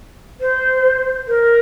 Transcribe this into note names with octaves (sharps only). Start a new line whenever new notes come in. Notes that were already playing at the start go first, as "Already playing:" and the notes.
C5
A#4